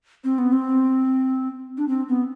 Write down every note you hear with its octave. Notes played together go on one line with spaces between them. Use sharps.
C4
B3
C4
D4
C4
B3